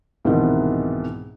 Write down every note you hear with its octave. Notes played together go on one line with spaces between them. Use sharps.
C2 G#2 B2 D#3 E3